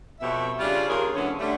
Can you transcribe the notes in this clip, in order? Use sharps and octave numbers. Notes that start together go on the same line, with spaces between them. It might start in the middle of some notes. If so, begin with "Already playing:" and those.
F2 B2 G4 C#5 E5
C#3 G3 C#4 D4 F4
D#2 C#3 F4 G#4 A#4 C#5
D2 D3 E3 F#3 C#4 C#5
D3 G3 A3